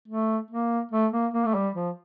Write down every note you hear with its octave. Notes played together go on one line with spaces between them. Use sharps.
A3
A#3
A3
A#3
A#3
A3
G3
F3